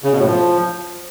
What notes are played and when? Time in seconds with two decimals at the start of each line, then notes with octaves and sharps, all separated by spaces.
0.04 C#3
0.11 B2
0.19 A2
0.26 F3